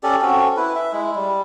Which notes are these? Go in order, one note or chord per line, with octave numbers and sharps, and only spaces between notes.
C#4 G4 A4 D5
C4 C#4 F#4 A4
E4 B4
E5
G#3 E4
G3